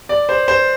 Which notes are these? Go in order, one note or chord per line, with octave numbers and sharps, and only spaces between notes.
D5
C5
C5